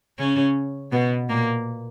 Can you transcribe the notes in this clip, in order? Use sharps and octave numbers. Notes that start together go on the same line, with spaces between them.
C#3 C#4
B2 B3
A#2 A#3